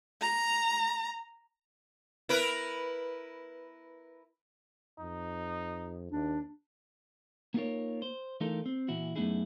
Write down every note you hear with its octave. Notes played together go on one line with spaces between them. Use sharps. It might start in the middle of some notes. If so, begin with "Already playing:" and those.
A#5
E4 A#4 B4
F2 D#4
D#2 D4
A#3 B3 D#4 F4 A#4 C#5
C5
E3 A3 D#4 F4 A4 A#4
C4
A#2 E3 E4 F#4
F#2 A3 B3 D#4 E4 G#4